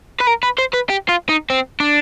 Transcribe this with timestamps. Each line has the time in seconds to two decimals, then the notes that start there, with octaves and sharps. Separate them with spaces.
0.21 B4
0.27 A#4
0.43 B4
0.58 C5
0.73 B4
0.89 G4
1.09 F4
1.29 D#4
1.50 C4
1.80 D4